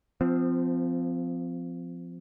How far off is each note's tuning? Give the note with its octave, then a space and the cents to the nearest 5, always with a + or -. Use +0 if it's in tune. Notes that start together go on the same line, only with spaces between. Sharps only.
F3 +0 C4 -25